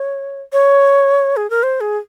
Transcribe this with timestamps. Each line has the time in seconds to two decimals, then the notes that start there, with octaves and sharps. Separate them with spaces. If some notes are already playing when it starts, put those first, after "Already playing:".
Already playing: C#5
0.53 C#5
1.37 G#4
1.50 A#4
1.63 C5
1.81 G#4